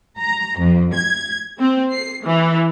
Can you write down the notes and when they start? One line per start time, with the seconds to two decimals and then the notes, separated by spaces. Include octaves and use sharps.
0.19 A#5
0.59 F2
0.94 G#6
1.59 C4
1.93 C7
2.25 E3